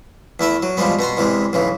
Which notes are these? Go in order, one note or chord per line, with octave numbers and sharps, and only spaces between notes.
E2 A3 E4 E5
F#3
B2 F3 G3 G#3 B3
B2 B3 A#5 C6
E2 C3 E3 G#3
B1 C#3 E3